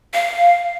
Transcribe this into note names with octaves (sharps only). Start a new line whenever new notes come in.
F5